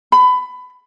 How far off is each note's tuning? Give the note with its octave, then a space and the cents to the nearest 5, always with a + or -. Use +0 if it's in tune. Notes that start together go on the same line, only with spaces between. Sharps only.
B5 +20